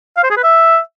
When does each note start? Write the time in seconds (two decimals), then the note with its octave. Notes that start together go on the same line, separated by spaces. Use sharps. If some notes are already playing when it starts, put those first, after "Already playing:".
0.17 F5
0.24 C5
0.30 G#4
0.37 B4
0.44 E5